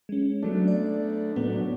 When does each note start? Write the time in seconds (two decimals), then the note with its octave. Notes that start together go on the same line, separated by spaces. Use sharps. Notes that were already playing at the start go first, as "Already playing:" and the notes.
0.09 G#3 C#4
0.42 F#3 A3 B3 D4
0.68 D5
1.36 A2 F#3 B3 D4